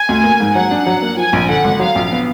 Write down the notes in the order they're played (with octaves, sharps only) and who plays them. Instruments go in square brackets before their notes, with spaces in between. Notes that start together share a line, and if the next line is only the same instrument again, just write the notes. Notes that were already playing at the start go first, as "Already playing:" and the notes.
Already playing: [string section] G#5
[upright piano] D2
A#3
G#2
[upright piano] F#3 [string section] F#5
[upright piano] D4
F#3
A#3
[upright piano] F3 [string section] G#5
[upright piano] A#1
[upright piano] D3 [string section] F#5
[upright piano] G#1
[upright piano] F#3 [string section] F5
[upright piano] A#1
B3